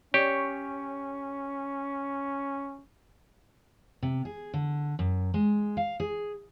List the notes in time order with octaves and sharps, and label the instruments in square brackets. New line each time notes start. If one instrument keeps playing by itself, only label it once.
[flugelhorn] C#4 [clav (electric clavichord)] G4 [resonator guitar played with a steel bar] C#5
[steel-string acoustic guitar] C3
G#4
D3
F#2
G#3
F5
G#4